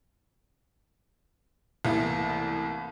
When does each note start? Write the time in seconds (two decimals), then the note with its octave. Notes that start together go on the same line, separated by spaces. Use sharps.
1.85 C2 A2 E3 A#3 B3